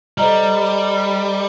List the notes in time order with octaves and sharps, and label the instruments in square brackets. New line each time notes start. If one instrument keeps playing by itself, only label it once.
[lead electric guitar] G3 [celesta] A4 C5 D#5 A#5